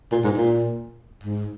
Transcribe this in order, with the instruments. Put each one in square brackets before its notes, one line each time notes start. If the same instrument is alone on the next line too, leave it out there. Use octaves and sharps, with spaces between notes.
[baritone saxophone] A#2
G#2
A#2
G#2